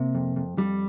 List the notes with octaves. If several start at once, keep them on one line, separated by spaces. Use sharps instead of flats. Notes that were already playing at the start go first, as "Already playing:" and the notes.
Already playing: C3 A#3
F2
F2
F2 G3